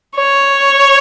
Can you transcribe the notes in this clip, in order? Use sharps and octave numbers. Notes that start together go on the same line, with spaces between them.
C#5